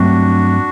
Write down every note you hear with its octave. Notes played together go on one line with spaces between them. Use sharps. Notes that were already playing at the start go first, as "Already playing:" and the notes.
Already playing: G2 F#3 A3 C4 D4 F#4